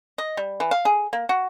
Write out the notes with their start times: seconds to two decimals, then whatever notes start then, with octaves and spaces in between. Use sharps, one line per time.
0.18 D#5
0.37 G3
0.60 E3
0.71 F5
0.85 G#4
1.13 A#3
1.29 F#4